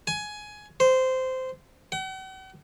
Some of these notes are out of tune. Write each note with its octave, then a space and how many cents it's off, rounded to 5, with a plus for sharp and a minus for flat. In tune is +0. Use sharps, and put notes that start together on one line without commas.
G#5 +15
C5 -15
F#5 +45